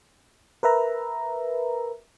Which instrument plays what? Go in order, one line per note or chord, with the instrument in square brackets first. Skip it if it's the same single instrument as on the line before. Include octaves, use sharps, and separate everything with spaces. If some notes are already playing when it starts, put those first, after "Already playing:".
[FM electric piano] A#4 B4 E5 A#5